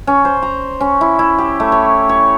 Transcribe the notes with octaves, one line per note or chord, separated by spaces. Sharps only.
C#4
C5
A#5
C#4
E4
E4
G4
A3
C#5
C#5